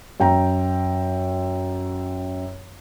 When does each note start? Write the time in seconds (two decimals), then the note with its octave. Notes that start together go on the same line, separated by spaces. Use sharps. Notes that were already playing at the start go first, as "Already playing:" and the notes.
0.20 F#2 G5 A#5